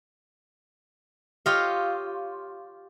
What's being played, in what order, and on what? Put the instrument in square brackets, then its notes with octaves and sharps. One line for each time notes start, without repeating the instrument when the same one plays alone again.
[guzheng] F4 G4 C#5 D#5 F5